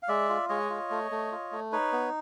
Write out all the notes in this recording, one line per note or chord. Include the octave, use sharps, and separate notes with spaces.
F5
G#3 D5 E5
F4
G#3 C#5 D#5
F4
A3
A3
F4
A3
D#4 B4 C#5
B3